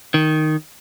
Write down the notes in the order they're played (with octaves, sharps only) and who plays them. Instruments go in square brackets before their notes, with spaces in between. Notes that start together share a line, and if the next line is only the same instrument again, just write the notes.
[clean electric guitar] D#3